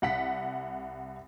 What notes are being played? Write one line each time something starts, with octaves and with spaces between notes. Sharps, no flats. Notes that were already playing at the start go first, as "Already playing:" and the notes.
C2 F#5 B6